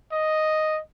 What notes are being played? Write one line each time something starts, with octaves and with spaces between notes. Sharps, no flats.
D#5